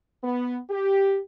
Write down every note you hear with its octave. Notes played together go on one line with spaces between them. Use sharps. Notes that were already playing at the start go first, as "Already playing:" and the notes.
B3
G4